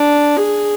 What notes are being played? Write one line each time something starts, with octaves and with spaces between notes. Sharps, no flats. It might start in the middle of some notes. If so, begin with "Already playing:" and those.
Already playing: D4
G#4